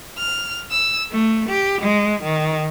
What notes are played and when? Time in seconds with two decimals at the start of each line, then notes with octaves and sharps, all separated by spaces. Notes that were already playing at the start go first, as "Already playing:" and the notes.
0.17 F6
0.70 E6
1.11 A3
1.48 G4
1.81 G#3
2.22 D#3